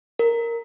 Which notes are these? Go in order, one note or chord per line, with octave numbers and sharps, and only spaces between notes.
A#4